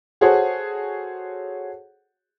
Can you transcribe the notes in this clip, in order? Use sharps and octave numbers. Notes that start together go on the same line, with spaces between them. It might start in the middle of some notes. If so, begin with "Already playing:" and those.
F#4 G#4 A4 C5 C#5 F#5